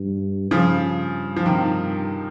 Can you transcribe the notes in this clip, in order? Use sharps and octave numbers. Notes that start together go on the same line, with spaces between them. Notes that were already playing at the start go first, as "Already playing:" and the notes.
Already playing: G2
G2 C#3 F3
F3
C3 D#3